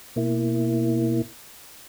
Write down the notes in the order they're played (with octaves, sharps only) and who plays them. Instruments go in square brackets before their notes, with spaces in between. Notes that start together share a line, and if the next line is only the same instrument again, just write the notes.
[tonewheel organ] B2 A#3 E4